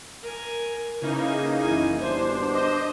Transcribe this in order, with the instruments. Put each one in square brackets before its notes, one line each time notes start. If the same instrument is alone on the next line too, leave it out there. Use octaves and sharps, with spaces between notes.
[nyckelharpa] A#4 G#5
[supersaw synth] C#3 A#3 D#4 [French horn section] E4 B4 [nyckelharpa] G#5
[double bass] F#1 E3 [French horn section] E4
[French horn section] B2 D3 G3 [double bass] D4 [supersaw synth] C5
[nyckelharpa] C5 [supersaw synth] D#5